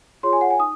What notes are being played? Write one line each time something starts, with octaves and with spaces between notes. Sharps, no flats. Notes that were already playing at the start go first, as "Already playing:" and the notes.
F4 G#4 C#5 C6
G#5
F#5
G#5
D#4 D#6